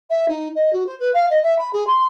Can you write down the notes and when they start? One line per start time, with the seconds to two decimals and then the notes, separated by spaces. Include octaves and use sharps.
0.10 E5
0.28 D#4
0.55 D#5
0.73 F#4
0.86 C5
0.99 B4
1.14 F5
1.30 D#5
1.43 E5
1.58 B5
1.73 G#4
1.87 C6